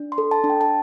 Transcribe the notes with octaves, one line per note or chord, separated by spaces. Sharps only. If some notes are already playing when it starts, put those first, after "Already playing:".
Already playing: D4
C6
A4
A5
D4
G5
A5